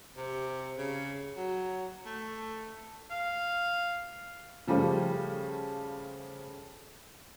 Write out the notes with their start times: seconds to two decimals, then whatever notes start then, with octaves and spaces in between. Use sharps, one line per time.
0.17 C3
0.78 C#3
1.37 F#3
2.06 A3
3.11 F5
4.67 C#3 F3 G3 A3